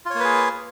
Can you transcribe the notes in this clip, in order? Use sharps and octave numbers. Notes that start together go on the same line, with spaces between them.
A#3 F4 G#4 B4 C#5